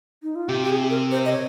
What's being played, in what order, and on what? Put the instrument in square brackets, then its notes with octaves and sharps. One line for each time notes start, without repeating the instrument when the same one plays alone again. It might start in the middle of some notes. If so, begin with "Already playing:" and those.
[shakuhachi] D#4
F4
[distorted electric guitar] C3 [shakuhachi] G4
[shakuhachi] G4
G#4
A#4
C5
D#5
C#5